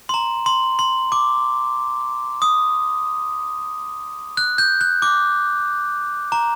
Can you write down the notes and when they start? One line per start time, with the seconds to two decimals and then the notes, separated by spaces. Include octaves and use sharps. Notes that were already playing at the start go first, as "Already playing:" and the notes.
0.09 C6
0.14 A#5
0.46 C6
0.79 C6
1.12 D6
2.42 D#6
4.37 F#6
4.58 G6
4.81 F#6
5.02 D6
6.32 A#5